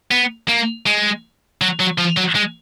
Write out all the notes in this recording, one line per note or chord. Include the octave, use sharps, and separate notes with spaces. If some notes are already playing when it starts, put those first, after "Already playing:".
B3
A#3
G#3
F#3
F#3
F3
F#3
G#3